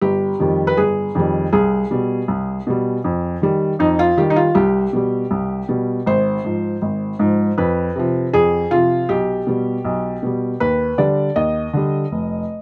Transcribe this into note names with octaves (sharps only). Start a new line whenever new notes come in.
G1 G4
F2 D#3 G3
B4
G1 G#4
F2 D#3 G3
C2 G#4
B2 G3
C2
B2 G3
F2
D#3 G3
F2 D#4
F4
D#3 G3 G4
D#4
F4
C2 G4
B2 G3
C2
B2 G3
G#1 C5
G#2 F3
G#1
G#2 F3
F2 B4
C3 F3
F2 G#4
C3 F3 F4
B1 G4
B2 G3
B1
B2 G3
D#2 B4
D3 G3 D5
D#2 D#5
D3 G3
F1